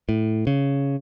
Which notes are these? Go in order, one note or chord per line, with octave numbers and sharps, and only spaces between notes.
A2
C#3